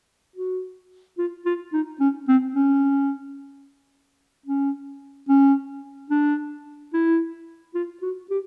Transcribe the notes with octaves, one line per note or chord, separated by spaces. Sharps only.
F#4
F4
F4
D#4
C#4
C4
C#4
C#4
C#4
D4
E4
F4
F#4
G4